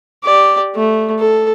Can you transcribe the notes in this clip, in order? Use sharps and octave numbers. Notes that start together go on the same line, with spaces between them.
G4 D5
A3
A4